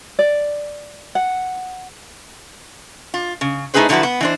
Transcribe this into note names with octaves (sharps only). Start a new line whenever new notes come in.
D5
F#5
F4
C#3
A3 D#4 E4 G#4 B4 C5
D3 F3 F#3 E4 F#4 B4
B3
E3 D4 C5